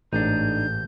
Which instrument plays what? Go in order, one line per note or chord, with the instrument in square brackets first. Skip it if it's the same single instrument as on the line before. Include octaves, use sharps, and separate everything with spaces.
[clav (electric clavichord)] A1 [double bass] G#2 A3 [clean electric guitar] D4 D#4 [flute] G6